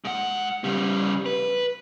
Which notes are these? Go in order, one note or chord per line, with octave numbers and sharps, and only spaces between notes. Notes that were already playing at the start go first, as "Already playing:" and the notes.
G#2 F#5
C#3 G3
B4